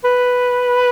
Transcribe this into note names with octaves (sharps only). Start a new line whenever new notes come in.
B4